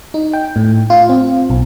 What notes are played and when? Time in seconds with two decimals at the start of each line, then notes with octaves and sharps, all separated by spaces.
0.14 D#4
0.33 G5
0.56 A2
0.90 F4
1.09 C4
1.50 B1